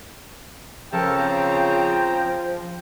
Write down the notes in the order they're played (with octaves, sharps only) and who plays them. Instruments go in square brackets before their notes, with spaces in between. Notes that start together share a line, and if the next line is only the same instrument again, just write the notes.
[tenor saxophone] C#3 [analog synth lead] F3 [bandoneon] A4 A#4 A5 [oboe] G5
[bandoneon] C4 C5 A#5